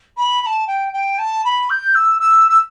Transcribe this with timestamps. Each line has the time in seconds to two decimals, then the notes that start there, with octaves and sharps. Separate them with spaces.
0.17 B5
0.41 B5
0.46 A5
0.67 G5
0.93 G5
1.18 A5
1.44 B5
1.70 G6
1.95 E6
2.20 E6
2.49 E6